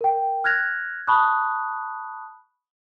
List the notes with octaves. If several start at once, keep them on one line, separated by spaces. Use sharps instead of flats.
A#4 G5
F6 F#6 G#6 A#6 F7
A5 B5 C#6 D#6 F#6